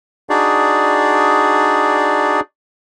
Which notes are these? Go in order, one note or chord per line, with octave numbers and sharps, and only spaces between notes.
D4 D#4 F#4 G#4 D5